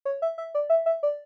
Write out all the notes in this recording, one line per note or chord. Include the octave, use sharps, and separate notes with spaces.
C#5
E5
E5
D5
E5
E5
D5